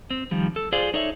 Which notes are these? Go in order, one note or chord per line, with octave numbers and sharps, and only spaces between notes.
C4
D#3 F3 G3
A4
F4 G#4 C5 D5 F5
D#4 A4 C#5 D5 E5